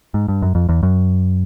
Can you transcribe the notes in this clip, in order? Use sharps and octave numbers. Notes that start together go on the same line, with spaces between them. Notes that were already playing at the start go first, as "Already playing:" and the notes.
G#2
G2
F#2
F2
E2
F#2